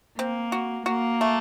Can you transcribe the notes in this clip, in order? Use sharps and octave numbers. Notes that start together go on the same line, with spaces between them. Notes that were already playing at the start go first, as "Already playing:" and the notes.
A#3 C4
F#4
A#3 F#4
A3